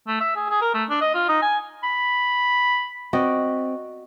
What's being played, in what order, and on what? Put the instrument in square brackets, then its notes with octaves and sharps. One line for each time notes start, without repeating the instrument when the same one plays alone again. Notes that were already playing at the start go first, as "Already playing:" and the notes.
[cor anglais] A3
E5
G#4
G#4
A#4
A3
D4
D#5
F4
D#4
G#5
[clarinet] B5
[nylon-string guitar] C4 [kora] F#4 D5 D#5